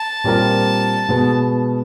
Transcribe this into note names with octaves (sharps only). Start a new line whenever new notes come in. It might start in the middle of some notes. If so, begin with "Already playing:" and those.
Already playing: A5
A#2 G3 C4 F4 A#4
B2 G#3 B3